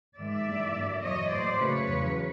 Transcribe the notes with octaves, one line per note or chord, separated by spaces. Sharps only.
G#2 D#3 G#3 D5 E5
G2 E3 G3 A#3
G2 D3 F#3 A#3
E2 B2 F#3 C#5 D#5
A2 F#3 A#3 C5 D5
F#2 C#3 F#3 A3 B4 C#5
E2 C#3 F#3